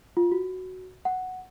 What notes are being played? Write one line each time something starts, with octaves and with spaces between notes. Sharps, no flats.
F4
F#4
F#5